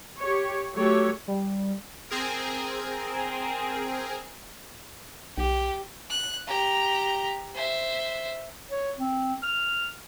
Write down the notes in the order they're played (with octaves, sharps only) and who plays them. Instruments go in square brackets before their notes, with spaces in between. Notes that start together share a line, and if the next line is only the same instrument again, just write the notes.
[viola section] G4 C#5
F#3 A3 G4 A4 C#5
[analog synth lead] G3
[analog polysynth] C4 G#4 A#4
[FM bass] B1 [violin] G4
[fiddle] F#6
G4 A#5
C5 E5
[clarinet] C#5
C4
F6